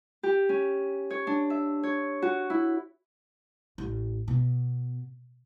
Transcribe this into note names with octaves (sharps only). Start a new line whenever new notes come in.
G4
C#4
C#5
D4
E5
C#5
F#4
E4
A1
B2